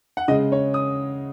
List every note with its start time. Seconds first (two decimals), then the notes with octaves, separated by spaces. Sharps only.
0.17 F#5
0.28 C#3 G#3 D#5
0.52 C#5
0.74 D#6